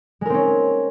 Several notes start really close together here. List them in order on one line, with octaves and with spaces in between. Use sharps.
G#3 A#4 C4 C#4